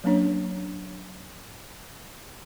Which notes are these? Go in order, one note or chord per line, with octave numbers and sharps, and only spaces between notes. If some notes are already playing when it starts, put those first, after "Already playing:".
F#3 A#3 C#4 D4 C#5